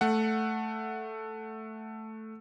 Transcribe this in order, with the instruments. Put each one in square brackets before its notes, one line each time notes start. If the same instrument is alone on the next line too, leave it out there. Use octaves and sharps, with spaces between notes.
[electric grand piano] A3 F#5